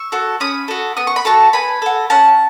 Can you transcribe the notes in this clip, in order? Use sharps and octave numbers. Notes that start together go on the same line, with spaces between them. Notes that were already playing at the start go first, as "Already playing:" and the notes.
Already playing: C#6 E6
F#4 A4
C#4 B5 D#6
F#4 A4
B3 D#6
C#6
B5
F#4 A4 A5 C#6
B3 G#5 B5
F#4 A4
C#4 F#5 A5